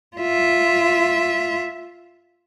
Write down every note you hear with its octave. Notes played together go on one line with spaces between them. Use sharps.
F4 E5